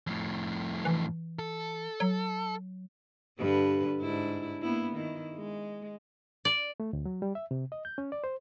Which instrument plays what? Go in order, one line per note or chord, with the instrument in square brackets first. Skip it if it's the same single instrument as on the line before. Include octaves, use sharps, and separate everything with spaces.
[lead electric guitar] F2 A2
[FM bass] E3
[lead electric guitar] A4
[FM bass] F#3
[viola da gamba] G2 D3 B4
G#2 D4 E4
A#3 B3 E4
D#3 E4
G#3
[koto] D5
[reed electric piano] A3
D2
F#3
G3
E5
C3
D#5
G6
C#4
D5
C5